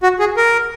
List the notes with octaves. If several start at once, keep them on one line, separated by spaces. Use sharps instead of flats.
F#4
G#4
A#4